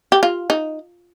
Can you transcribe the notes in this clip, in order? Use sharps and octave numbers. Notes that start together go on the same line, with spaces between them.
G4
F4
D#4